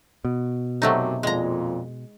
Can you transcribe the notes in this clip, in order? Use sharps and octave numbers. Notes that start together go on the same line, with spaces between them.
B2
F#2 C3 F#3 A3 D#4
F2 A#2 G#3 A#5